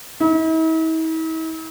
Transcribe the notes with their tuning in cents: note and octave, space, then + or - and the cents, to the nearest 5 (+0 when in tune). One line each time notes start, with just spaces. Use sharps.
E4 -45